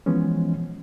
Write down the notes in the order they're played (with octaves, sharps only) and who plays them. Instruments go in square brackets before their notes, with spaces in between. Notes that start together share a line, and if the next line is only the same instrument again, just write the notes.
[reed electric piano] E3 F3 G#3 B3 C#4